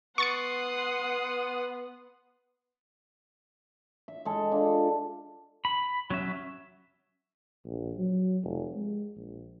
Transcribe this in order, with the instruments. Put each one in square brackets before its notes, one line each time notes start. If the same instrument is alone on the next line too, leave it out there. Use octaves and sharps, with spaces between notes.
[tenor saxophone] B3 [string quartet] F#5 C6 D#6 [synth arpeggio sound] C#6 A6 C#7
[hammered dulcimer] E5
G#3 A4
D4 F4
[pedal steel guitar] B5
F#3 C#4 E5
[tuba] A#1
F#3
F1
G#3
A#1